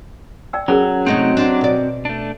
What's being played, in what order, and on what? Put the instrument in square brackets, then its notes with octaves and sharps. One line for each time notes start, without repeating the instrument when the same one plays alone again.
[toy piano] D5 G5 E6
[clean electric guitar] F#3 [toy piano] C#4 G#4 A#4
[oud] C3 A3 D#4 [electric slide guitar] C4 F#4 D#5
[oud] D4 C5
B2 D5
[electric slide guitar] A3 D4